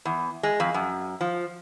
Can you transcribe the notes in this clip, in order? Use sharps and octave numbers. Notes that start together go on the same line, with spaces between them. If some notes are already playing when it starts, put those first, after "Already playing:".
E2
G#3
F2
F#2
F3